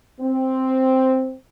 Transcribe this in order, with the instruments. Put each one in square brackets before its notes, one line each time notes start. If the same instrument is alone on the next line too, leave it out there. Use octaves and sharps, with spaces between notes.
[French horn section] C4